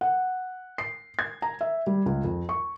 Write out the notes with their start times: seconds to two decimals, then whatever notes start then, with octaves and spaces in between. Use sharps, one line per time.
0.01 F#5
0.78 C7
1.19 G#6
1.42 A#5
1.61 E5
1.87 G3
2.06 C#2
2.24 F2
2.49 C#6